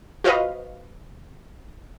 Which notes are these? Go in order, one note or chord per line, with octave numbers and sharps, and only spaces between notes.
F4 F#4 B4 C5 D#5 F5